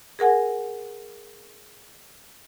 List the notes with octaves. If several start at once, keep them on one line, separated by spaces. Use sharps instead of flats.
G#4 A#4 F#5 G#5